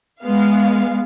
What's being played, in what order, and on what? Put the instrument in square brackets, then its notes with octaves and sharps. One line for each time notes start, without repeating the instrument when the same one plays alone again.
[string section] G#3 B3 F5